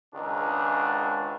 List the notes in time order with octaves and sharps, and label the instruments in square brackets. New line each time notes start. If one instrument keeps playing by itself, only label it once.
[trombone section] C#2 G#2 D#3 D4